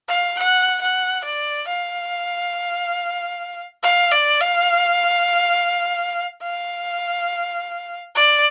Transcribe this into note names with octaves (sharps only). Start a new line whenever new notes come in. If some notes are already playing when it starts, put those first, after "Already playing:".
F5
F#5
F#5
D5
F5
F5
D5
F5
F5
D5